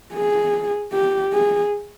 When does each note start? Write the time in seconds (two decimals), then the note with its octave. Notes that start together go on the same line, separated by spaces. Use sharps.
0.14 G#4
0.93 G4
1.33 G#4